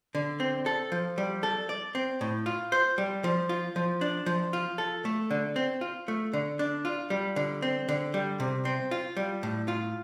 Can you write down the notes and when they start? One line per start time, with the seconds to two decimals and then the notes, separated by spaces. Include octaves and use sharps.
0.15 D3
0.40 C4
0.66 A4
0.92 F3
1.18 G3
1.43 A4
1.69 D5
1.95 C4
2.21 A2
2.46 F4
2.72 C5
2.98 G3
3.24 F3
3.49 F4
3.76 F3
4.01 D4
4.26 F3
4.53 F4
4.78 A4
5.05 A3
5.31 D3
5.56 C4
5.81 F4
6.08 A3
6.33 D3
6.59 D4
6.85 F4
7.10 G3
7.36 D3
7.62 C4
7.89 D3
8.14 G3
8.40 C3
8.65 C4
8.91 F4
9.17 G3
9.43 A2
9.68 F4